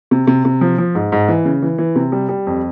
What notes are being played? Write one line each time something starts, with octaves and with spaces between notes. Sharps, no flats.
C3
C3
C3
F3
F3
G#2
G#2
E3
C#3
E3
E3
C3
G3
G3
F2